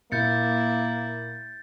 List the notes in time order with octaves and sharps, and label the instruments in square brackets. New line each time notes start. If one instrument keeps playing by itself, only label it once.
[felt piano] A#2 [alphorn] A#3 [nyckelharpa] E4 [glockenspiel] G6 A6 C#7